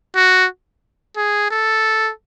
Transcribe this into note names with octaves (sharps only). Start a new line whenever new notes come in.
F#4
G#4
A4